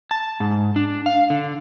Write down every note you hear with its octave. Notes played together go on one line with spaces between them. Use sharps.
A5
G#2
D4
F5
D3